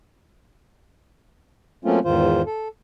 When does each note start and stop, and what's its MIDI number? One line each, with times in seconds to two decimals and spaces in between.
1.85 1.99 54
1.85 1.99 57
1.85 1.99 58
1.85 1.99 60
1.85 1.99 61
1.85 1.99 65
2.05 2.42 40
2.05 2.42 44
2.05 2.42 51
2.05 2.42 65
2.05 2.42 72
2.46 2.68 69